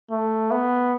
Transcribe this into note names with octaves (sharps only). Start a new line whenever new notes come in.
A3
B3